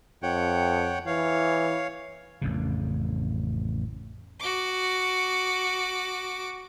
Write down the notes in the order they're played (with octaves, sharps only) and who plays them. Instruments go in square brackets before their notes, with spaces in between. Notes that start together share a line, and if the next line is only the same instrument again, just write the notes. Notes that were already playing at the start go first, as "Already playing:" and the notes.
[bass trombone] F2 [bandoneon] C#5 F#5 G5
[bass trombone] E3 [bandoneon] C#5 F5
[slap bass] A1 F2 C#3
[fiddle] F#4 D6